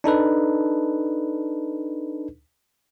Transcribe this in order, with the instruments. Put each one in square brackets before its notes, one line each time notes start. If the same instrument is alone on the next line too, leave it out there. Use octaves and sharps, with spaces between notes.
[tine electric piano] D4 D#4 A4 B4